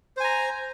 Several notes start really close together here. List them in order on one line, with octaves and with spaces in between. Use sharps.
C5 G#5 A#5